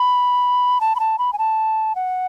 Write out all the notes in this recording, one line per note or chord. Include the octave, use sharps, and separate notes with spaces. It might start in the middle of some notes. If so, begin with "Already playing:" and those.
Already playing: B5
A5
B5
A5
B5
G#5
A5
F#5